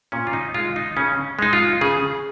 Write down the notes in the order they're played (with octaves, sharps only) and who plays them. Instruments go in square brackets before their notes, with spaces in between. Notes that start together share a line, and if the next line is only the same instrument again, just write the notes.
[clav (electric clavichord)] A#2 C#4
F4
D#4
G#3 F4
D#4
C#3 C#4
G#3 D#4
F4
C#3 G#4